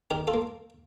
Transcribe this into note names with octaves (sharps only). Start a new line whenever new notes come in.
D#3 G4 A#4
F4 A4
A#3